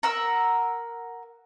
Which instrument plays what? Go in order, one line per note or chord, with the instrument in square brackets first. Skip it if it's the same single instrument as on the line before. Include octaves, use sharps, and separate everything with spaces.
[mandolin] A#4 F#5 E6